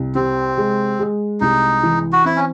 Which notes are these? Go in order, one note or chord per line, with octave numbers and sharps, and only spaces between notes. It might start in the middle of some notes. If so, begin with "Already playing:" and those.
Already playing: C2
C3 C4
G#3
G#3
C2 D#4
E3
F#4
C4 E4
C#4